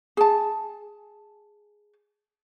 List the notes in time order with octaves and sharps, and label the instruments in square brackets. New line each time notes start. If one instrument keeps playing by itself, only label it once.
[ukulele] G#4 A5